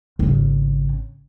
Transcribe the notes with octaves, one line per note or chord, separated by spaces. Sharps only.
G#1 C#3